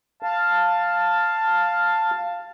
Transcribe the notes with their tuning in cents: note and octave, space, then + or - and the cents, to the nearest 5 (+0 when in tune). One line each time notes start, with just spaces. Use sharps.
F5 +0 A5 +10